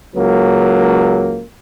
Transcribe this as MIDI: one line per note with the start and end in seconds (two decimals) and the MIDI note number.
0.14 1.42 37
0.14 1.42 54
0.14 1.42 58